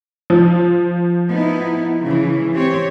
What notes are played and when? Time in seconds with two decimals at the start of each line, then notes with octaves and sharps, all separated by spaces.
0.30 F3
1.30 B3 D#4 E4
2.02 C#3 E3
2.53 C4 G4 C#5